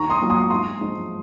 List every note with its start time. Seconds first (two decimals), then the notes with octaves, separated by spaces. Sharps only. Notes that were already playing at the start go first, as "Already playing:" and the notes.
Already playing: D#2 A#5 C#6
0.10 C6 D#6
0.20 D#3 F#3 A#3 F4
0.30 C6 D#6
0.50 G#2 C6 D#6
0.81 F3 G#3 D#4